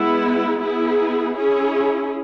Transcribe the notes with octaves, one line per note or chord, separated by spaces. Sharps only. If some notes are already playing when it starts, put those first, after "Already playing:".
Already playing: G#3 B3 E4
B3 E4 G#4
C#4 E4 G#4